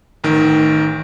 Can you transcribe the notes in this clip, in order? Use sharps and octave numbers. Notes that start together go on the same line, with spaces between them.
A1 D#3